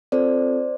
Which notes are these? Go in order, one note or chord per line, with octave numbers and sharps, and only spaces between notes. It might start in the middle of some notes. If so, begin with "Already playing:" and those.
C4 F4 A4 C5 D5